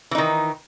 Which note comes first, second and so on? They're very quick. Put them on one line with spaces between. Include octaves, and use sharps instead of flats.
E3 D#4 D#3